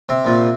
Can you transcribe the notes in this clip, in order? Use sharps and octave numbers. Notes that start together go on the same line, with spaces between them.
C3 C4
A#1 A#2 F3